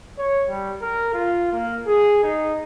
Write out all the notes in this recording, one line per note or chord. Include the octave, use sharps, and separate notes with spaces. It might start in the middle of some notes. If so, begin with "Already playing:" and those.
C#5
G3
A#4
F4
A#3
G#4
D#4